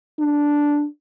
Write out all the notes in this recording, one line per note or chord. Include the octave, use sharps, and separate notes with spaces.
D4